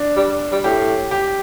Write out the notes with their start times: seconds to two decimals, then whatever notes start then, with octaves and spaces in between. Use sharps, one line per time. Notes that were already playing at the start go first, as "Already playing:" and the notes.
Already playing: D4
0.16 G3
0.52 G3
0.64 A2 G4
1.11 G4